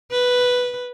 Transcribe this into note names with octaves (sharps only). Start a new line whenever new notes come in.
B4